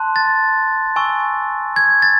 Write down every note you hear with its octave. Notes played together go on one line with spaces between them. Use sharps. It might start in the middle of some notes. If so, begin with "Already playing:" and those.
Already playing: A5 C6 F#6
A6
G#5 C#6 E6
G#6
A6